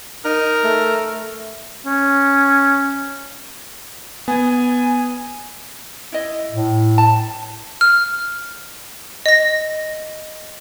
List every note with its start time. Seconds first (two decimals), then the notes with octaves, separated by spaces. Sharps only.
0.25 D#4 A#4
0.64 A3
1.86 C#4
4.28 B3 G#5
6.12 E4 D#5
6.51 A2
6.98 A5
7.81 F6
9.26 D#5 A#6